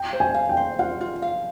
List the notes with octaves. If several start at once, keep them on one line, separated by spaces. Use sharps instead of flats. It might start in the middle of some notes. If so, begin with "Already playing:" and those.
Already playing: G5
C5
G#5
F5
G5
C5
F4 F#5
F4
F5